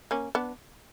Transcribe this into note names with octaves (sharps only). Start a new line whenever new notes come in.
A#3 C#4
B3 D4